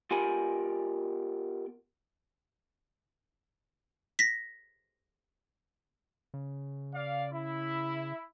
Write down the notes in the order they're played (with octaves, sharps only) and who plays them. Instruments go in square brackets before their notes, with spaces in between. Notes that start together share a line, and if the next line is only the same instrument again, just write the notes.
[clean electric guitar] B3 F4 G4 A#4 G#5 B5
[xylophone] A#6 B6
[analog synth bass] C#3
[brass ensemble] D5 F5
E4